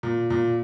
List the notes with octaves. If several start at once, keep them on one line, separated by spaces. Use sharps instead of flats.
A#2
A#2